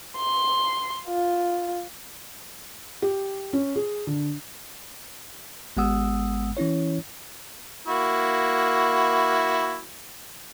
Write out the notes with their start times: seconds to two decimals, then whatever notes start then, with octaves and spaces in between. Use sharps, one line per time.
0.17 C6
1.06 F4
3.02 G4
3.53 C#4
3.76 G#4
4.07 D3
5.77 G#1 G#3 B3 F#5 D#6 E6
6.57 E3 C#4 E4 C#5
7.88 A#3 E4 F#4